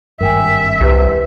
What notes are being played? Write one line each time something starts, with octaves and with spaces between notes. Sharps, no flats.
G#1 G2 A#4 E5 G5 G#5
C2 G4 B4